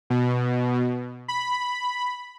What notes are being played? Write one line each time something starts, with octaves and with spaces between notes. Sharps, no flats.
B2
B5